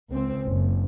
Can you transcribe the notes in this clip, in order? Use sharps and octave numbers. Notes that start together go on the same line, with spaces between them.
C#2 C4
F#1